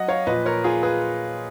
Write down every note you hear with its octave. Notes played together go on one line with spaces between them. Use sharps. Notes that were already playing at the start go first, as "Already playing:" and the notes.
Already playing: F#3 D#5 F#5
C#5 F5
A#2 F3 B4 D#5
A#4 C#5
F4 G#4
G#4 B4